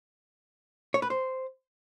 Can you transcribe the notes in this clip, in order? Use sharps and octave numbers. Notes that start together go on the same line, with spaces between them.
C#5
B4
C5